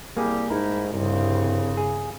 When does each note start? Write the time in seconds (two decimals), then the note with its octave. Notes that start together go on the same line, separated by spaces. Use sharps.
0.17 C2 G3 A#3 G4 G#4
0.50 G#2 A3 D#4 E4 A#4
0.94 C2 G2 C#3 C4
1.77 G#4